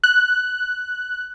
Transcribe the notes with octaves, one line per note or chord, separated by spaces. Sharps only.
F#6